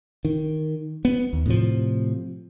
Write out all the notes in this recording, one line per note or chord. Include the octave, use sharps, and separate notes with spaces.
D#3
B3
D#2
A2 C3 F3